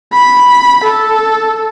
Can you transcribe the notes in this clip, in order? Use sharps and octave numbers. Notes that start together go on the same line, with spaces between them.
B5
A4